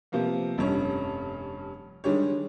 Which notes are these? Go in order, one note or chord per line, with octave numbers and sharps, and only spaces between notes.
C3 F3 A#3 B3
F1 G2 C#4 C#5
D#3 G3 G#3 D4 G4 C#5